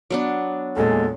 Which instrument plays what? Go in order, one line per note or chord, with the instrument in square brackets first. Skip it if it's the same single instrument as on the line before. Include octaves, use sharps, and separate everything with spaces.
[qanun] F#3 B3 D4
[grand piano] E2 A#2 G#3 [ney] A4